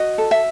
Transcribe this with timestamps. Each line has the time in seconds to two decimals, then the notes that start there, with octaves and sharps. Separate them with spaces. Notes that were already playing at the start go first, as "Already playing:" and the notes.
Already playing: F#4 D#5
0.18 A4
0.31 E5